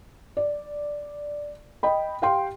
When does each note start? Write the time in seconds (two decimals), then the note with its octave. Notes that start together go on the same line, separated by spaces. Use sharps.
0.37 D5
1.83 D#5 G5 B5
2.22 G4 F5 G5 C6